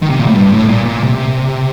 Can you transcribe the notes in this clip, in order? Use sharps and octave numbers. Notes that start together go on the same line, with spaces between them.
D#3
C3
A#2
A2
G2
A2
A#2
A#2
C3